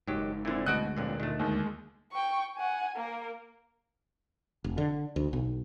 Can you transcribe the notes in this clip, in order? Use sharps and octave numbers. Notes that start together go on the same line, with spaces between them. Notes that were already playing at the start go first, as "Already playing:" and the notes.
F#1 G#2 D#3 F#3 G4
A#2 D3 C4 E4
D2 B2 G#3 F#4 D#5 F#6 D7
A1 F2 A#2 D3
D2 D#3 A3
D#2 G#3
G5 C#6
F#5 G#5
A#3 A#4
F1
D3
D2
B1